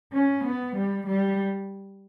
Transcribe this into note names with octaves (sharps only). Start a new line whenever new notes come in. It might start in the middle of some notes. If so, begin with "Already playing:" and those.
C#4
B3
G3
G3